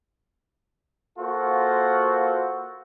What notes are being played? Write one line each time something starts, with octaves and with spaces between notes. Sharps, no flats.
A#3 F4 F#4 A4 A#4 C5